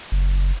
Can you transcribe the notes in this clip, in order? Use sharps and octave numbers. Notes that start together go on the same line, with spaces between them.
F#1